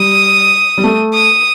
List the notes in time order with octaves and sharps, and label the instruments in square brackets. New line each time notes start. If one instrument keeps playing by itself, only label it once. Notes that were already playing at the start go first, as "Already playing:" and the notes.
Already playing: [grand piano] G3 [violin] D#6
[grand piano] G3
A3
[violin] D#6